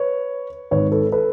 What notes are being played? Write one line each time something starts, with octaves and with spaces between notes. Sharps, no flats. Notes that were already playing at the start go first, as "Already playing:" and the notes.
Already playing: B4 C#5
G#1 G#2 D#3 B4 C#5
A4 B4
A4 B4